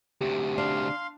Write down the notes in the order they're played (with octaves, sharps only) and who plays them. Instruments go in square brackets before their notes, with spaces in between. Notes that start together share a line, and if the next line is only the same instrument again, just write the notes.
[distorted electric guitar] D2 C3 [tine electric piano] G4
[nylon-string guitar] D4 [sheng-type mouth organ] F5 C6